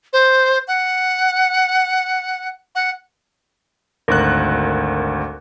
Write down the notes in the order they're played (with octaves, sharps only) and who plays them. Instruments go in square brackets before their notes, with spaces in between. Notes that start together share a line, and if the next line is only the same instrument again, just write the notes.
[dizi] C5
F#5
F#5
[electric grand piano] G#1 D2 F#6 [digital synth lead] A#4